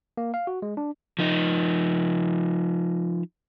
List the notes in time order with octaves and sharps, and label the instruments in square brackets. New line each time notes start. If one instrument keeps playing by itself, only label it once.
[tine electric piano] A#3
F5
F#4
G#3
D4
[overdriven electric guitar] F3 D#4